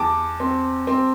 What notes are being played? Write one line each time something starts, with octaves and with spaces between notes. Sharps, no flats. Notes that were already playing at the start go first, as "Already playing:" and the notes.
Already playing: E2 A5 D6
C4
C4